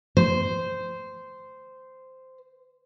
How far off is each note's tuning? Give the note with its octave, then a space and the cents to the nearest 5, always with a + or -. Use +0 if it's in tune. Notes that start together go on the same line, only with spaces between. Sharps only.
C5 -10